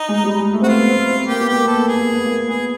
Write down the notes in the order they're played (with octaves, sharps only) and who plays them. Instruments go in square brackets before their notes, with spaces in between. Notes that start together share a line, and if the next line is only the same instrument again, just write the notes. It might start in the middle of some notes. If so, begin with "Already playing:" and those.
Already playing: [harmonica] D#4
[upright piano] G#3
G3
G#3
A3
[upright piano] C4 [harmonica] F#4
[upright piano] B3 [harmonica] F4
[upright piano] C4
C4
[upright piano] A#3 [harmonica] G4
[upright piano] B3
[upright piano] A#3 [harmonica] G4
[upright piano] B3 [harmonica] A4
[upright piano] A#3
[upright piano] B3 [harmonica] G#4
[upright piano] A#3
B3
A#3
[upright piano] B3 [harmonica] G#4